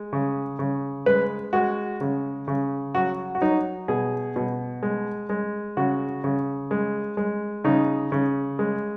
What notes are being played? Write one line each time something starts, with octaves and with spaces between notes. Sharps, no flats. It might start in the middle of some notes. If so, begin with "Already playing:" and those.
Already playing: G#3
C#3
C#3
G#3 B4
G#3 F#4
C#3
C#3
F#3 F#4
F#4
F#3 D#4
B2 G#4
B2
G#3
G#3
C#3 F#4
C#3
G#3
G#3
C#3 D#4
C#3
G#3